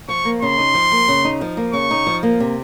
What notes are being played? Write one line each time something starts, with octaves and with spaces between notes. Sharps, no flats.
F3 C#6
A#3
C#3 C6
D#4
F3
A#3
C#3
D#4
F3
A#3
C#3 C#6
D#4
F3
A#3
C3